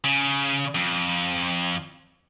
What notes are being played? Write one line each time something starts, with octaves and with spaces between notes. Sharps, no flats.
C#3
F2